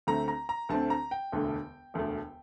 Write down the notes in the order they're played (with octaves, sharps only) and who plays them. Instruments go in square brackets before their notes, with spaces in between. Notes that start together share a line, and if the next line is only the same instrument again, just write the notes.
[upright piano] D2 D3 A3 C4 A#5
A#5
A#5
D2 D3 A3 C4 A5
A#5
G5
E1 D2 D3 A3
E1 D2 D3 A3